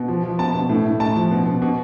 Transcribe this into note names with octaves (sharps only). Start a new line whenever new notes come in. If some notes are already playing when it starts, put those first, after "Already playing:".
Already playing: B2
F3
F3
B2 A5
B2
A2
A2
A2 A5
F3
B2
B2
B2